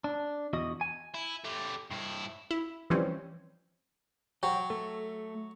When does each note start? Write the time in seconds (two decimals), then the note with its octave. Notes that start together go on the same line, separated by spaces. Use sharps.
0.04 D4
0.53 E2 F#4 D#5
0.81 G#5
1.14 E4
1.44 A3 G4
1.91 G2 E4
2.51 E4
2.90 E3 F3 G3 C4 C#4
4.43 F#3 G5
4.70 A3 A4